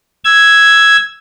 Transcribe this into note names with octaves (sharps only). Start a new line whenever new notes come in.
E6 G#6